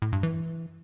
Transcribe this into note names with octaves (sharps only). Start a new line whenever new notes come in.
A2
G2
E3